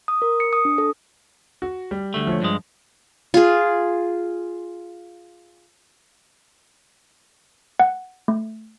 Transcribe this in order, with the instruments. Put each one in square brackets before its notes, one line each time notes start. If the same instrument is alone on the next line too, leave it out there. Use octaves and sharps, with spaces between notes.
[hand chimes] D#6
A#4
C#7
D#6
D4
A4
[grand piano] F#4
G3
[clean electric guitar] D2 A3
[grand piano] F3 C#5
[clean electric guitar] G2 G#3
[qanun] F4 G#4
[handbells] F#5
A3